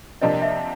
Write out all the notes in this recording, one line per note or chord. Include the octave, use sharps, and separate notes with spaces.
C3 F3 A#3 D4 G4 D#5
E5